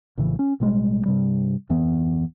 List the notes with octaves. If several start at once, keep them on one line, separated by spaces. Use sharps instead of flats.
A#1 A2 C#3 E3
C#4
A1 B2 G3 G#3
G2 C3 G3
D1 F2 E3 B3